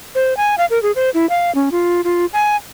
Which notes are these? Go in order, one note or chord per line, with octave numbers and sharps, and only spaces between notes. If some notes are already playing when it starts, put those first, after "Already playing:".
C5
G#5
F5
A#4
G#4
C5
E4
F5
C#4
F4
F4
G#5